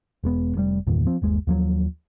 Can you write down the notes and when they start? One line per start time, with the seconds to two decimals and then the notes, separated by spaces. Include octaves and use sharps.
0.24 E1 G#3 B3
0.55 F1 B2 G3
0.87 G1 E2 A#2 D#3
1.07 F3 C4
1.22 G1 D#2 G#3
1.47 D#2 F3 F#3